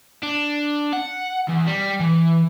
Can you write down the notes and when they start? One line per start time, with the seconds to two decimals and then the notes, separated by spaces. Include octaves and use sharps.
0.23 D4
0.93 F#5
1.48 E2
1.67 G3
2.00 E3